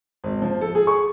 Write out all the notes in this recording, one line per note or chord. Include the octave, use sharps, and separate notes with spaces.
G#1
F3
A4
G#4
C#6